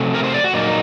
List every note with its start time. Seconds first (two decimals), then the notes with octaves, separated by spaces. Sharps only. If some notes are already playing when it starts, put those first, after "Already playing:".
Already playing: C3 F#3 A3
0.14 A#4
0.24 C5
0.34 D5
0.44 F#4
0.54 A#2 F#3 A#3 D#4